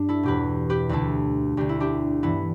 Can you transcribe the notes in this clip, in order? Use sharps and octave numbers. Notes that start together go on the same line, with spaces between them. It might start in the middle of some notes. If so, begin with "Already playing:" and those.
Already playing: G2 D4
E4 A4
E2 B2 G4 B4
G4 B4
D2 D3 E4 A4
D2 D3 G4
E4
D4 G4
G2 E3 B3 E4